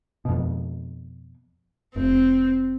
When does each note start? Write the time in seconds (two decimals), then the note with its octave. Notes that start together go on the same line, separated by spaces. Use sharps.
0.25 F2 B2
1.96 F1 C4